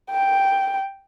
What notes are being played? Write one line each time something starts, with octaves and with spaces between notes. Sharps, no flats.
G5